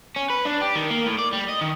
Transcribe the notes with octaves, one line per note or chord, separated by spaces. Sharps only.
C#4
B4
D4
G4
D#3
A#3
A2
D5
G3
D#5
D#3